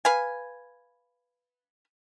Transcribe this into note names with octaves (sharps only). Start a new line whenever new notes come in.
B4 F5 G#5